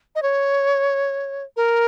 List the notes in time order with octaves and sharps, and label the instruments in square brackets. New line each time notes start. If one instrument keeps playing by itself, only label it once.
[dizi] D#5
C#5
A#4